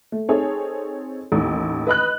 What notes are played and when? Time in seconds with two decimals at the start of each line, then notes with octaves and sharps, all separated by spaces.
0.12 A3
0.29 C4 D#4 G#4 A4 C#5
1.32 A1 D#2
1.87 B4 D#5 B5 F#6